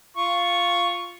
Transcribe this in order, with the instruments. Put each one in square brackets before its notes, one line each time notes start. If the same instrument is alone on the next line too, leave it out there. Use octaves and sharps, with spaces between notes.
[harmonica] F4 C#6